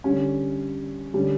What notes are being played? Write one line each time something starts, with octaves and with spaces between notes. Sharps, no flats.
D3 G3 C#4
D3 G3 C#4